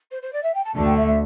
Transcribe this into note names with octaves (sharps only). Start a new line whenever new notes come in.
C5
C5
D5
E5
G5
A5
D2 D3 A3 A5
G5
E5
E5